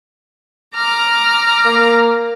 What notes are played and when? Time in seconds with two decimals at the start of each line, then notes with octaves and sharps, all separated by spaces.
0.75 A#5 D6 F6
1.65 A#3